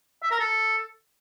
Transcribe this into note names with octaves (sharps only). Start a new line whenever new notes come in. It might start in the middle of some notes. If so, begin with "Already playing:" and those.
E5
A#4
A4